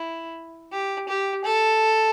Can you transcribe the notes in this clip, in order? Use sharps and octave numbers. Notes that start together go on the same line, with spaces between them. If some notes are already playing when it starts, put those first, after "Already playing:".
Already playing: E4
G4
G4
A4